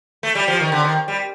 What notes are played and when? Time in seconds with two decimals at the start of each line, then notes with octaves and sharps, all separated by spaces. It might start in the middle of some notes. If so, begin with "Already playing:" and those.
0.23 A3
0.35 G3
0.48 F3
0.60 D#3
0.72 D3
0.84 D#3
1.08 G3